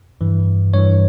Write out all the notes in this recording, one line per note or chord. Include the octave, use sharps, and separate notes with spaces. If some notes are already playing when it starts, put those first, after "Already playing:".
G2 E3
G2 E3 C#5